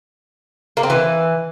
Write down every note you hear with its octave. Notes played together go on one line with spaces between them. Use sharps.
A#3
C4
E3